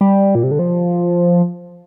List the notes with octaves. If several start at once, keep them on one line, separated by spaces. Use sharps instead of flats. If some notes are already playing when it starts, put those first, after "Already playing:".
G3
A#2
C3
D3
F3